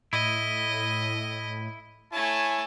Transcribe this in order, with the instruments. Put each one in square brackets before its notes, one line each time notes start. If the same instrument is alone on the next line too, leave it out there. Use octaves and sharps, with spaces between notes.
[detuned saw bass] A2 [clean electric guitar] E4 [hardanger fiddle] D#5
[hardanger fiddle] A3 A5 [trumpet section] E4 C#5 G#5